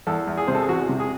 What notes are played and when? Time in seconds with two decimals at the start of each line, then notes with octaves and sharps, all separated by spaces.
0.07 E2 A4
0.27 E2
0.37 G#4
0.48 C3 C5
0.55 A4
0.62 G#4
0.69 E2 F#4
0.89 C3
1.00 G#4